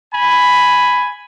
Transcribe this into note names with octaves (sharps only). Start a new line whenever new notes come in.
G#5 B5